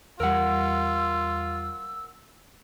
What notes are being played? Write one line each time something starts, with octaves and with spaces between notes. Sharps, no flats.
E2 G3 F4 A#4 F#5 E6